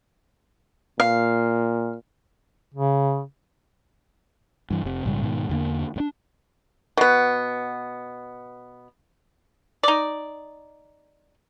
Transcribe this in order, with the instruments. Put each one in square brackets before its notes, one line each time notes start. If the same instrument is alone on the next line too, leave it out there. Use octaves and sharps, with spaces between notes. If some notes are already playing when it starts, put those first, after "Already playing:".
[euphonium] A#2 [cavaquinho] F5
[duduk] C#3
[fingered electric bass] G2 E3
F1 C3
A#1 G#2 C#3 G3
G#2 B2 D#3
E2 D3 A#3
G2 D4
[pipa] B2 B3
D#4 D5